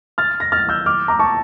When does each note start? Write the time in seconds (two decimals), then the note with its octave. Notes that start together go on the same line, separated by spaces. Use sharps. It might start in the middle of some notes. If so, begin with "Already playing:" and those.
0.18 F6 A6
0.40 A#6
0.52 F6 A6
0.69 E6 G6
0.86 D6 F6
1.08 A#5 D6
1.19 A5 C#6